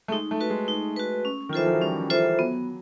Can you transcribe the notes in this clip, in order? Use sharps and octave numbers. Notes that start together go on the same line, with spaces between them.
A3
G#3 D#4
A3
F#4 B4
G#3
D#4
F#4 B4
C#4
D#3
E3 F4 A4 C5 E5
F3
F#3
G3 C#4
F4 A4 C5 E5
F#3 B3